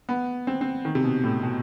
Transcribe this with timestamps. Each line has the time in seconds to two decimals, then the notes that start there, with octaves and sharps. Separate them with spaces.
0.09 B3
0.47 C4
0.61 C4
0.85 D#3
0.95 C3
1.04 B2
1.24 A2
1.43 B2